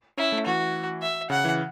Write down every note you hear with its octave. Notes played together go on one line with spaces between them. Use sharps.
C#4 E4
A3
E3 F#4
E5
C#3 F#5
E3